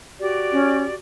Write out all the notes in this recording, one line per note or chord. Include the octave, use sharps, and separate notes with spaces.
F#4 G4 D5
C#4